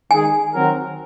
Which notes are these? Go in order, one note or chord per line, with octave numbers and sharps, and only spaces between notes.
D#3 G#3 D#4 G#4 G#5
D#3 F#3 C4 F#4 A#4